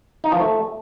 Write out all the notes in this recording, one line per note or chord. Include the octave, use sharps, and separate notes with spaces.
D#4
F3
A3